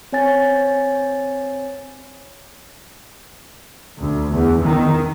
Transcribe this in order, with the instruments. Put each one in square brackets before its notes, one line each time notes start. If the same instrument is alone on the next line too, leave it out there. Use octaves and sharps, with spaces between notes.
[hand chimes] C4 C#5 G#5 A6
[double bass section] D2
E2
D#3